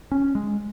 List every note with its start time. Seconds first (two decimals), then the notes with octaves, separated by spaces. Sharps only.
0.12 C#4
0.35 G#3